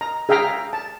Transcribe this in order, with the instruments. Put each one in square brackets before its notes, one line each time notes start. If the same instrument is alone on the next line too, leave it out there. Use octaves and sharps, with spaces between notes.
[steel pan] A#5
G#4 E5 F5 G5 A#5
A5